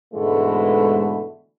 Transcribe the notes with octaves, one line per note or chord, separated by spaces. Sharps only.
G#2 B2 D3 E3 G#3 A3